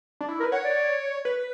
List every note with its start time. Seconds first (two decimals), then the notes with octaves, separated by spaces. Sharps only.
0.21 D4
0.29 E4
0.40 A#4
0.43 B4
0.52 C#5 F#5
0.64 D5
1.25 B4